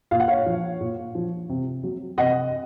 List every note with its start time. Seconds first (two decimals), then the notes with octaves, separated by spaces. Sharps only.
0.11 A#2 F5
0.20 F#5
0.28 C#5 F5
0.46 F3
0.80 A#2
1.15 F3
1.49 C3
1.83 F#3
2.18 C3 D#5 F#5